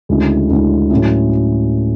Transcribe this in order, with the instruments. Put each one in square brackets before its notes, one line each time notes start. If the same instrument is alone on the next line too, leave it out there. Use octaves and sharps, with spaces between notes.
[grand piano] D2 C#3 G#3 C#4 E4
D2 C#3 G#3 C#4 E4
A2 F#3 C#4 E4